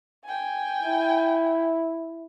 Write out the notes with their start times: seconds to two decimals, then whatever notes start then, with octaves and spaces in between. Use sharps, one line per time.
0.25 G5 G#5
0.83 E4